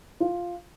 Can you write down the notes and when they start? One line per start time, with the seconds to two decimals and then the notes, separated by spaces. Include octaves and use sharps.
0.20 F4